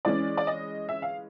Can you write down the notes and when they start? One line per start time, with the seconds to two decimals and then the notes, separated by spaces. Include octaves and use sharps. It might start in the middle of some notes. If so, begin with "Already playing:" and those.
0.05 E3 G#3 C#4 D5
0.37 D5
0.47 D#5
0.89 E5
1.02 F5